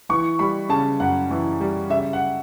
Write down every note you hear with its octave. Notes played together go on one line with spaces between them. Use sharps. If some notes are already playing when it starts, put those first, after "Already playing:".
E3 C#6
G3 B5
C#3 A5
F#2 F#5
E3
G3
C#3 E5
F#5